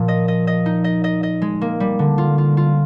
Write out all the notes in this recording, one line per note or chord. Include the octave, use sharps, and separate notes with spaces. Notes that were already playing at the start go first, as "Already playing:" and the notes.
Already playing: A#2 F3
D#5
D#5
D#5
D#4
D#5
D#5
D#5
G#3
A#3
G3
D3
F4
F4
F4